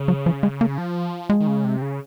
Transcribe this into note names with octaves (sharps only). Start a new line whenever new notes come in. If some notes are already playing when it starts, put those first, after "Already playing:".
Already playing: C#3
F#3
F3
G#3
A#3
F3
G#3
D#3
C#3
C3
C#3